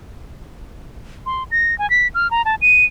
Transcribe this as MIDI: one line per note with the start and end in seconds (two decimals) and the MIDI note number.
1.26 1.43 84
1.51 1.77 94
1.79 1.89 80
1.90 2.08 95
2.15 2.30 89
2.31 2.42 82
2.45 2.55 81
2.62 2.85 99